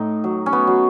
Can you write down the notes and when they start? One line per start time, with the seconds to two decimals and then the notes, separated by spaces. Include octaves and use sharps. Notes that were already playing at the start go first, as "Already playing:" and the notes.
Already playing: A2 D#4
0.24 F#3
0.46 C#4
0.53 B3
0.67 F#3